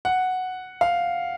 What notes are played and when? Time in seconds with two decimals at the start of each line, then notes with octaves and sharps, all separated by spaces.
0.05 F#5
0.81 F5